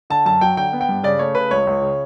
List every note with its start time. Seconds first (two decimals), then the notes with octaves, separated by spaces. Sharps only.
0.10 D3 A5
0.26 F#2 A5
0.41 F#3 G5
0.57 D3 G5
0.73 B3
0.81 G5
0.89 G2
1.03 C#3 D5
1.19 A3 C#5
1.35 C#3 B4
1.51 C#2 C#5
1.67 C#2
1.82 C#3